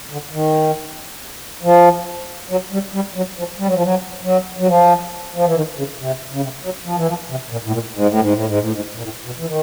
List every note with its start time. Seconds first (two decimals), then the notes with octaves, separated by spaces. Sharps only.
0.11 D3
0.32 D#3
1.63 F3
2.50 F#3
2.72 G3
2.94 G3
3.15 F#3
3.37 F3
3.59 G3
3.66 F#3
3.75 F3
3.83 F#3
4.24 F#3
4.59 F#3
4.67 F3
5.36 F3
5.45 E3
5.55 D#3
5.77 C#3
5.99 C3
6.32 C#3
6.42 C3
6.63 F#3
6.85 F3
6.96 E3
7.08 F3
7.29 C3
7.50 A#2
7.65 A2
7.72 A#2
7.94 G#2
8.08 A2
8.20 G#2
8.33 A2
8.46 G#2
8.59 A2
8.72 G#2
8.96 A#2
9.03 A2
9.25 B2
9.38 E3
9.47 D#3